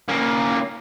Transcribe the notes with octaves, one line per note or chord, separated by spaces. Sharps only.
A#3 C#4